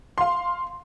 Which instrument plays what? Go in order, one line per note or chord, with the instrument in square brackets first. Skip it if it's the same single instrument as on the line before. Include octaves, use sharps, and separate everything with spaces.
[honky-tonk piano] F5 C6